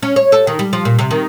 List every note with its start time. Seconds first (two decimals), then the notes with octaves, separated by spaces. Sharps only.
0.03 C#4
0.16 C#5
0.32 A4
0.47 D#3
0.59 G3
0.73 F3
0.85 A#2
0.99 C3
1.11 D#3